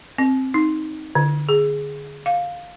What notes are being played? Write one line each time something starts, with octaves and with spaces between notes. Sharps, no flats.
C4
D#4
D3
G#4
F5